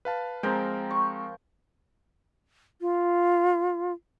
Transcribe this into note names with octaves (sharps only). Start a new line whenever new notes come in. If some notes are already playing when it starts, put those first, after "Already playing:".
B4 F5 A5
F3 G#3 C4 A#4 G5
C#6
F4